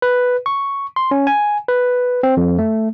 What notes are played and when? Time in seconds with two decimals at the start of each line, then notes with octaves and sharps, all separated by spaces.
0.02 B4
0.46 C#6
0.96 C6
1.11 C#4
1.27 G#5
1.68 B4
2.23 C4
2.37 F2
2.59 A3